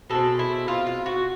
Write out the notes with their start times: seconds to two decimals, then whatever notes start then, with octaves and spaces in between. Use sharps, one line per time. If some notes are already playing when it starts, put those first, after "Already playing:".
0.10 B2 G#3 C4 A4
0.39 E4
0.68 F4
0.87 F4
1.06 F#4